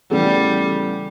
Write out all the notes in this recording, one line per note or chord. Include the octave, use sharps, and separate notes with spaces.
E2 C#3 E3 G3 A3